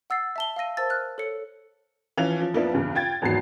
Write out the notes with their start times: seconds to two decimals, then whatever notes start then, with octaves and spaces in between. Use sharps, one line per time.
0.10 F#5 E6 A6 C7
0.36 E5 A5 G7
0.56 F5 A5 E6 A#6 D#7
0.77 A#4 C5 A5 E6 A6
0.90 F6 F#6
1.18 A4 C#5 C#7
2.17 E3 F3 C#4 F4 F7
2.41 F3
2.54 F2 F3 A#3 B3 D4 E4
2.74 E2 G2 C#3
2.95 F4 G5 G#6 A6
3.22 G#1 E2 F#3 D#4 C7